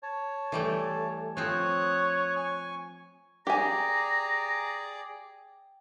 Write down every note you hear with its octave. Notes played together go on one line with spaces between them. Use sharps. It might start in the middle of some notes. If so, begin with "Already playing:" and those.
C#5 A5
E3 G3 A3
F3 C4 C#5 D#6 F#6
G#5 C#6
G4 G#4 D5 G5 G#5 A#5